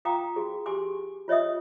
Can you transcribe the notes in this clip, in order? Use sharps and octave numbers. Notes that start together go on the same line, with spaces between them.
F4 F5 G5 A#5 D6 D#6
F#4 G#4
G4 G#5 C6 D6
F4 C#5 D#5 E5 D#6